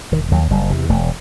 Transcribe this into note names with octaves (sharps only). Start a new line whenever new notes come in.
E1 D#3
D#2 F#3
F#1 G3
E2 C3
E1 A3